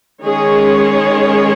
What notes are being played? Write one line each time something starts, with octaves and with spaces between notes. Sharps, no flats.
D#3 G#3 C#4 G#4 C#5